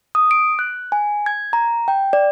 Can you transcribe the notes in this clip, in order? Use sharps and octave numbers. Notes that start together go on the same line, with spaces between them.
D#6
D7
F#6
G#5
G#6
A#5
G5
D5